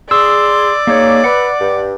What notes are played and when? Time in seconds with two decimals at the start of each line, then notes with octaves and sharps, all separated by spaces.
0.11 G#4 D5 C6 E6
0.87 G#3 A#3 D#4 C#5
1.24 B4 F#5
1.60 G2